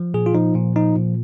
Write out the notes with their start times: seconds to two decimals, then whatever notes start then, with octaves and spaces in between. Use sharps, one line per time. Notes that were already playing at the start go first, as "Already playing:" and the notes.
Already playing: F3
0.14 A#2 G#4
0.26 F4
0.35 F3 D#4
0.55 A#2
0.76 F3 D#4
0.96 A#2